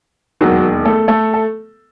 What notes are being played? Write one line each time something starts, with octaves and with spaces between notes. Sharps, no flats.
E1 D#2 D#3 F#3 F#4
A3 A4
A3 A4
A4